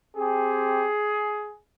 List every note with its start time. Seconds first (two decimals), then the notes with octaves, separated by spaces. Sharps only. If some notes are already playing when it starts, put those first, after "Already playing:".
0.15 C4 G4 G#4